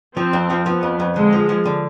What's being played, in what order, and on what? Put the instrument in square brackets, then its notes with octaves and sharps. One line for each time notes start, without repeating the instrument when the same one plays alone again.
[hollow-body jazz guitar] F3 [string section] C4
[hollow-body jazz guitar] F2
F3
[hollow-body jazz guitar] F3 [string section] B3
[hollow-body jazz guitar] F2
F2
[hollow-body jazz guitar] D3 [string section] G#3
[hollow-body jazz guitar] F3
F3
D3